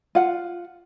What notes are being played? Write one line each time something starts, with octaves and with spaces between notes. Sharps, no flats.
F4 F#5